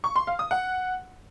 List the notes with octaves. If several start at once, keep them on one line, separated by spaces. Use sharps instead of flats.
C#6
C6
F5
D#6
F#5